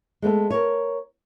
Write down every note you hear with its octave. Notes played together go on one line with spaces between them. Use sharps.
G#3 A3 B3 A4
A#4 C#5